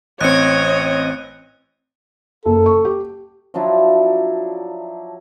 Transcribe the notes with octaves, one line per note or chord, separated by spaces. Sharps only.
A1 C4 C#5 D#5 F#6 C#7
F#1 A4
C#6
G4
F3 F#3 D4 E4